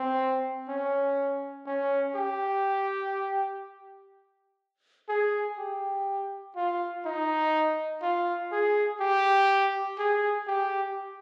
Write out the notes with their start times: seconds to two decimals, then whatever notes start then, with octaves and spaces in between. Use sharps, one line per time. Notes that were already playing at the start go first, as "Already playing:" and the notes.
Already playing: C4
0.69 C#4
1.66 C#4
2.15 G4
5.09 G#4
5.58 G4
6.56 F4
7.05 D#4
8.02 F4
8.52 G#4
9.00 G4
9.99 G#4
10.47 G4